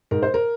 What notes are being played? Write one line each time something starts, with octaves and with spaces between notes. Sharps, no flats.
G#2 A#4
C5
A#4